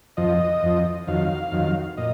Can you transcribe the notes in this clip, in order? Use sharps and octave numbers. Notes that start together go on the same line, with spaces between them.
F2 F3 D#5
F2 F3
F2 D#3 F#3 F5
F2 D#3 F#3
A#2 D#5